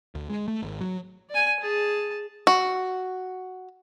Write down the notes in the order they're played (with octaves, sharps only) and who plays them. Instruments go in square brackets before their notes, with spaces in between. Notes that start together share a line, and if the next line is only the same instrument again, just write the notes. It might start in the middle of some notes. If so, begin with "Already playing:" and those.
[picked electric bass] D2
G#3
A3
G#1
F#3
[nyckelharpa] D5 G#5
G#4 A5
[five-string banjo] F#4